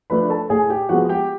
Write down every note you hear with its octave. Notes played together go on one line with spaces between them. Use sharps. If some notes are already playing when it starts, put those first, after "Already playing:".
F3 A3 D4 B4 B5
A4 A5
A2 G#4 G#5
G4 G5
F3 G#3 B3 F#4 F#5
G4 G5